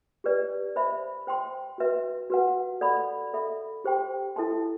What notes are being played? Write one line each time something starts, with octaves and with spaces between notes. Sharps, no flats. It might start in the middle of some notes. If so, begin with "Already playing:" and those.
G4 B4 D5
C5 E5 B5
C5 G5 C6
F#4 B4 E5
F#4 B4 F#5
A4 D5 F#5 B5
A4 E5 B5
G4 C5 G5 C6
E4 A4 E5 A5 C6